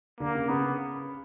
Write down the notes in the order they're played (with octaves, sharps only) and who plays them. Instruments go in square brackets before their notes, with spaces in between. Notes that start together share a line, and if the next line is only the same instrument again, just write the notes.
[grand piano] D3 [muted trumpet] A#3
[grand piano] C#3
[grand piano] C#3 [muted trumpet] B3